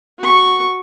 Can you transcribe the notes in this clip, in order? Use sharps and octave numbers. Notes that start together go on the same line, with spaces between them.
F#4 C#6